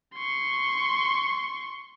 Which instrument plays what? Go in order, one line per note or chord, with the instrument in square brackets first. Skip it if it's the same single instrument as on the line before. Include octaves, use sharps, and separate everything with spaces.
[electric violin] C6 C#6